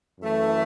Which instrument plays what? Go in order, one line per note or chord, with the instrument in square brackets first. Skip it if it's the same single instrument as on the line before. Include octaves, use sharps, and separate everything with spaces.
[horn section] F#2 E3 A3